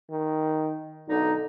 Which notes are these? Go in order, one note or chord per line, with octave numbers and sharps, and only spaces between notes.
D#3
B1 D3 D#4